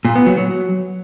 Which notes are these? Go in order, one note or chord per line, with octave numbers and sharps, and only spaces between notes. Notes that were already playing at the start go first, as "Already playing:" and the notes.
A#2
B3
F#3
F#3